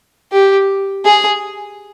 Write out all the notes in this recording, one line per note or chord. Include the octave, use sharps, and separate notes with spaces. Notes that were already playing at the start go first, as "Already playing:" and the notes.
G4
G#4